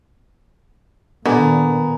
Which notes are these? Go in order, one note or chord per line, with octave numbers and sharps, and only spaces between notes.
A#2 D3 D#3 B3 A#4 G#5